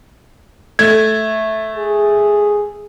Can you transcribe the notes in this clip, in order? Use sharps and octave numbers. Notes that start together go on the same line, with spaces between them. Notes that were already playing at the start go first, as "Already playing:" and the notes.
A3 G#6
G#4